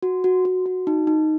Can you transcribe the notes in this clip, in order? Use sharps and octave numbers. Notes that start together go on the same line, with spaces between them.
F#4
F#4
F#4
F#4
D#4
D#4